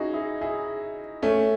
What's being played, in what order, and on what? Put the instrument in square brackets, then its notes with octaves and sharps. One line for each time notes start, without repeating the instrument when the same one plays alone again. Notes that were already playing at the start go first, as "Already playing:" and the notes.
Already playing: [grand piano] C#4 D#4 E4 F#4 G#4
E4 G#4
E4 G#4
A3 C#4